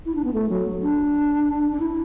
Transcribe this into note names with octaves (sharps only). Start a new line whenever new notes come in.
E4
D4
B3
A3
F#3
D4
D4
E4